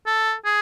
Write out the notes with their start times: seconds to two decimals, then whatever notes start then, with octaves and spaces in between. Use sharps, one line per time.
0.06 A4
0.45 G#4